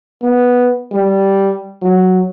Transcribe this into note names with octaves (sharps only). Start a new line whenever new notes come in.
B3
G3
F#3